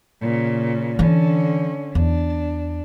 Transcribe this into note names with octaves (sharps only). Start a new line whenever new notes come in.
A#2 C#3
D3 E3 C#4 D4
E2 D4